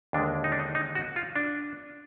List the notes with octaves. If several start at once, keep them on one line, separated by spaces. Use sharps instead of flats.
D#2 D3 G#3 D4
D#4
D4
D#4
D#4
F#4
F4
D4